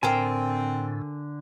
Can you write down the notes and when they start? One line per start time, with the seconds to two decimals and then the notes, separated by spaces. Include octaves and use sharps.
0.03 A2 D3 C4 A#4 C5 G5 G#5